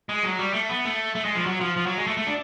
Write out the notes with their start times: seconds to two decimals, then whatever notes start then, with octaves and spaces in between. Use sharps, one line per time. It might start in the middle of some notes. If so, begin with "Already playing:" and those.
0.09 G#3
0.23 F#3
0.39 G3
0.54 A3
0.69 B3
0.85 A3
1.15 A3
1.25 G#3
1.35 F3
1.46 F#3
1.61 F3
1.76 F3
1.86 F#3
1.97 G#3
2.07 A3
2.17 A3
2.27 D4